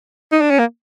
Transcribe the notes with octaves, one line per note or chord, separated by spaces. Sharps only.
D#4
D4
C#4
A#3